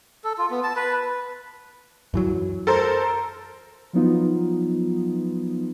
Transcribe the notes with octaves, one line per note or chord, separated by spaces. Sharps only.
A4
F4
B3
A5
B4
F#2 E3 F#3
A4 A#4 C5
F3 F#3 B3 D#4 F4